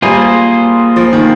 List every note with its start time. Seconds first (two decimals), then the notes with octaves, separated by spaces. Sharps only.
0.02 G3 A#3 F4 G#4 C5
0.96 F3
1.13 D#3